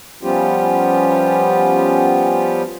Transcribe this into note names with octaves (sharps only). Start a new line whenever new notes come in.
F3 G3 B3 C#4 F4 G4